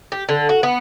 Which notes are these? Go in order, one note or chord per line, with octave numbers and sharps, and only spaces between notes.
G4
D3
F#4
B3